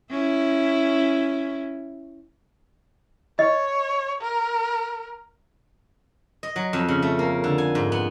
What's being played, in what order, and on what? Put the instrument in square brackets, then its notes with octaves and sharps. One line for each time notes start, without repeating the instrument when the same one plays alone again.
[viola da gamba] C#4 E4
[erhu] C#5 [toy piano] D#5
[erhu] A#4
[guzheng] D#5
F#3
F2
C#3
A3
A#3
D3
G#5
G#2
B3